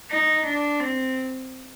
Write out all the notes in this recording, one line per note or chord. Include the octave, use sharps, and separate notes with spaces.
D#4
D4
C4